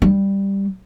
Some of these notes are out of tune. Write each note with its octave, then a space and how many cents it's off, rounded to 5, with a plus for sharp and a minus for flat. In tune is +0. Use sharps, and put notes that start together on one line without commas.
G3 +5